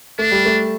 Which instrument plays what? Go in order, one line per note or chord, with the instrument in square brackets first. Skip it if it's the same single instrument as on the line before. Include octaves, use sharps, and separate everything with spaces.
[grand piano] A3 [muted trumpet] D4
[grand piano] G3
A3